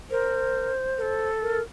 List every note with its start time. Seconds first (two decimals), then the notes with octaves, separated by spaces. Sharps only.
0.10 A#4 C5
0.98 A#4
1.02 A4
1.42 A#4